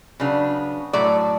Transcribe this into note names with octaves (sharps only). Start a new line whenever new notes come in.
C#3 F#3 B3 D4
A2 F#3 A3 D5